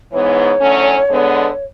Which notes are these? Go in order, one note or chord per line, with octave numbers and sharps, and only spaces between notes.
G#2 E3 B3 C#5
E2 D3 F#3 A3 C#4
D3 G#3 B3